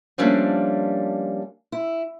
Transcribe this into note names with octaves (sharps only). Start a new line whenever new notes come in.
F3 G3 A3 A#3 C#4 D4
E4